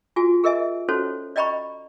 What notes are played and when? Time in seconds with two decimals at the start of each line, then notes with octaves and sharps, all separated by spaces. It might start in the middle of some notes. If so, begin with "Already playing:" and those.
0.16 F4 F#4 G#4 G#5
0.44 G#4 A#4 D#5 E5 G#5
0.89 C#4 D#4 F#4 A4 C5 C#5
1.36 D5 D#5 G5 A#5 B5 C#6